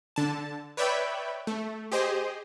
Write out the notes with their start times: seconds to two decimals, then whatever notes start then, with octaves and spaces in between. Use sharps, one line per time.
0.16 D3 A5
0.77 B4 C#5 D5 E5 G5 B5
1.47 A3
1.92 G4 G#4 C5 D#5